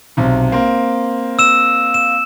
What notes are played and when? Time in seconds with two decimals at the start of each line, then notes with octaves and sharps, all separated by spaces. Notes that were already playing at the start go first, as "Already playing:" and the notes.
0.17 B1 C3
0.52 A#3 C4
1.39 E6 E7
1.94 E7